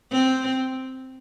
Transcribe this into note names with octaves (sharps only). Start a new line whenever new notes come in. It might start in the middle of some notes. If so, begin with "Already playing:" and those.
C4